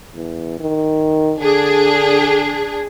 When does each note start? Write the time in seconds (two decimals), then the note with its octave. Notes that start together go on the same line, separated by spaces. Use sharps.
0.15 E2
0.60 D#3
1.40 D3 D4 G#4